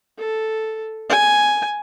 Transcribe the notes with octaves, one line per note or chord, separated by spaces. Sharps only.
A4
G#5